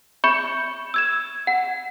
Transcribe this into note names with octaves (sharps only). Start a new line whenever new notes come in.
E5 B5 C#6 G6 C#7
E6 G#6 E7
F#5